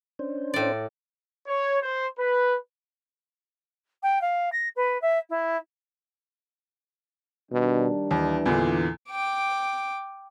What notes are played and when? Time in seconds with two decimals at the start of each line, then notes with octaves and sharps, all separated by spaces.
0.19 C#4 D4 C5
0.54 A2 D5
1.46 C#5
1.81 C5
2.19 B4
4.03 G5
4.21 F5
4.52 A#6
4.76 B4
5.01 E5
5.29 E4
7.52 B2 D#3 G3 D4
8.11 D#2 E3
8.46 E2 A#2 D3
9.09 G5 D6